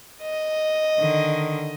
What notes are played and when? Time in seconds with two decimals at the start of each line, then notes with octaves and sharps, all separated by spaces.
0.23 D#5
0.99 D3 D#3